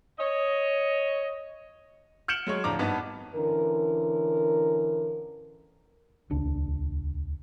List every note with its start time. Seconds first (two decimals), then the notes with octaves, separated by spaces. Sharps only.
0.19 C#5 D#5
2.28 F6 G6 C#7 D7 E7 F#7
2.47 F#3 G#3 C#5
2.64 D1 F3 D4 A#5 D6
2.79 G#1 G2 B3 D#4 A5
3.35 D3 E3 C#4 A#4
6.30 D#1 C#2 D4